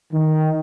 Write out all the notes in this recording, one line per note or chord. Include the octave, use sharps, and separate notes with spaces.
D#3